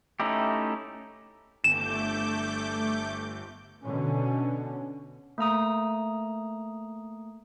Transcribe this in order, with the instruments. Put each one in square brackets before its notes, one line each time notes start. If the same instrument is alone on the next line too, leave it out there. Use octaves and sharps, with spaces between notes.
[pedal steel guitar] A3 C#4 D#4 E4 G4
[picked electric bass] G1 [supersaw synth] A3 D6 G6 [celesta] E7
[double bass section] B2 D3 C#4
[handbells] A3 A#3 A#5 D#6